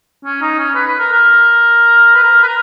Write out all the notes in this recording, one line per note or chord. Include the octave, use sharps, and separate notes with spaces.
C#4
D#4
C#4
B4
B4
A#4
A#4
B4
A#4
B4
A#4